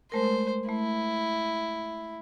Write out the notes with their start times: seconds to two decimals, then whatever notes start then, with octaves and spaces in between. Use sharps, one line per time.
0.12 G#3 A3 A#4 C5
0.69 A3 E4